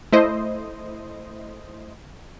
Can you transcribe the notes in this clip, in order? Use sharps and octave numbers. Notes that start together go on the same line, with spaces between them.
A3 E4 C5 D#5